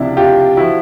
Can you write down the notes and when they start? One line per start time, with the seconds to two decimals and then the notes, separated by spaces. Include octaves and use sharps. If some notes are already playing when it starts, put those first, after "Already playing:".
Already playing: C#2 C3 F3 D4 E4
0.17 F4 G4
0.57 F3 E4 F#4